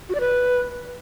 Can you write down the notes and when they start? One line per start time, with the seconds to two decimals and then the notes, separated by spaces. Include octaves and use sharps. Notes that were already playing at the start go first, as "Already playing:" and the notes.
0.09 F#4
0.15 D5
0.20 B4